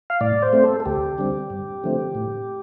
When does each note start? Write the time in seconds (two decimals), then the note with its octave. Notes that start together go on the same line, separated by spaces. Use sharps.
0.10 F5
0.21 A2 D5
0.42 C5
0.53 A3 C4
0.64 A4
0.80 A4
0.85 D2 G4
1.18 D3 G3 C4
1.50 G2
1.84 D3 F3 A3 C4
2.15 A2